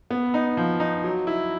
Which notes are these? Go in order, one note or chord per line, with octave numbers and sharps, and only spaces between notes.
B3
D#4
F3
D#4
F#3
E4